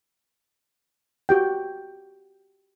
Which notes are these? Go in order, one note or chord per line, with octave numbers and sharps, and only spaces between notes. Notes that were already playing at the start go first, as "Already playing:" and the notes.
F#4 G4 G5